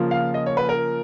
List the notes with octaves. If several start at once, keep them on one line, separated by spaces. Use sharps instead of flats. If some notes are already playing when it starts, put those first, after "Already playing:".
Already playing: C#3 F3 A#3 F4
F5
D#5
C#5
B4
A#4